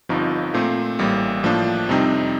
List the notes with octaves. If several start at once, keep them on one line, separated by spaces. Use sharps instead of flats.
G1 G2 F3 C4 D#4
A#2 A3 C4
A1 A2 G3 A#3
A2 F3 A#3 D4
F2 C3 G3 C4 D#4